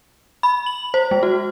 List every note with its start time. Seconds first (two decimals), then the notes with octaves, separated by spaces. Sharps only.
0.43 B5
0.66 F#7
0.94 C5
1.11 G#3
1.23 F#4